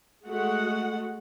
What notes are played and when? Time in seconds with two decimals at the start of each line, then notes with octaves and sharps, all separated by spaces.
0.25 G#3 A3 F#4 F#5